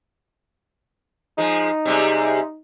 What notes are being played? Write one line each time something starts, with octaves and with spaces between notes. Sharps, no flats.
F3 G#3 D#4
C3 G3 G#3